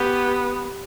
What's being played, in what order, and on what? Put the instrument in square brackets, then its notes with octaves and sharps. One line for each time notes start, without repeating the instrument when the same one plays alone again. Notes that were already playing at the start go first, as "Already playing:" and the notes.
Already playing: [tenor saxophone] B3 [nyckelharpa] G4